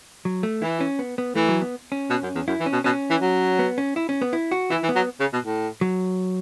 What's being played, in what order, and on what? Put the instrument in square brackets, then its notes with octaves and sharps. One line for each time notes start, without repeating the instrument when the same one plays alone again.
[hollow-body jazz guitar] F#3
A3
[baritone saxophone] E3 [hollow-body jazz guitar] E4
[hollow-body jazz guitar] C#4
B3
B3
[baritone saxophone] E3 [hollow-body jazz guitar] A3
[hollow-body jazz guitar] F#3
B3
C#4
[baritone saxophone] B2
F#2
E2
[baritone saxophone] F#2 [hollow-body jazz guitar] E4
[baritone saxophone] E3
[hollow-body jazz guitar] C#4
[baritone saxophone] B2
[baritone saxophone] B2 [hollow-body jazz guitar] C#4
[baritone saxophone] E3
F#3
[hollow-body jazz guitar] B3
C#4
E4
C#4
B3
E4
F#4
[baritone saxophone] E3 [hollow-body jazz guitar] E4
[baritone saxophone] E3
[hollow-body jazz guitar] B3
[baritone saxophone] F#3
C#3
B2
A2
[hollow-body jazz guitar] F#3